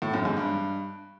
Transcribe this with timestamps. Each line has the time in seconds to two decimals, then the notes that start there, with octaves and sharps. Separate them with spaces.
0.02 A2
0.14 F#2
0.25 G#2
0.37 G2